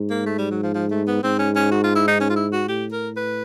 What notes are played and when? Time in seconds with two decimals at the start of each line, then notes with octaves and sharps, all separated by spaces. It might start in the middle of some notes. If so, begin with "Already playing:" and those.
Already playing: G#2
0.10 A#3
0.26 A3
0.38 G3
0.51 F#3
0.63 F3
0.74 F3
0.91 A3
1.07 B3
1.23 G#2 C4
1.39 C#4
1.56 C#4
1.71 F#4
1.84 F4
1.96 E4
2.07 D#4
2.20 C#4
2.30 F4
2.36 E4
2.52 F#4
2.68 A2 G4
2.92 A#4
3.17 B4